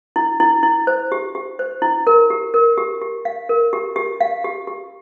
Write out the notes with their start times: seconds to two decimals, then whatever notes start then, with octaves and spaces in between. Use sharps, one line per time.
0.16 E4
0.40 E4
0.63 E4
0.87 C5
1.12 G4
1.35 G4
1.59 C5
1.82 E4
2.07 A#4
2.30 G4
2.54 A#4
2.78 G4
3.02 G4
3.25 F5
3.49 A#4
3.73 G4
3.96 G4
4.21 F5
4.44 G4
4.67 G4